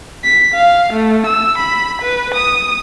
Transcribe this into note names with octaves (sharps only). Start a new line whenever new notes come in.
B6
F5
A3
E6
B5
B4
D#6